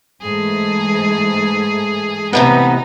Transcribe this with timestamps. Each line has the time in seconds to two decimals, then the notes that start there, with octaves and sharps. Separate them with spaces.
0.22 G#2 E3 A3 G#4
2.33 A2 C3 E3 B3 D#4